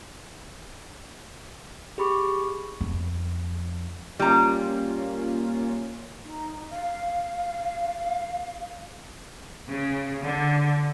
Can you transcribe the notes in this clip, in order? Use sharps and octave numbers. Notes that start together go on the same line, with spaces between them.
G4 G#4 B5 C#6 D6
F2
G3 A#3 C#4 F4 A#5
D#4
F5
C#3
D3